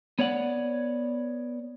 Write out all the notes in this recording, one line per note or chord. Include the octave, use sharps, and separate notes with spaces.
B3 C#5 D5 F#5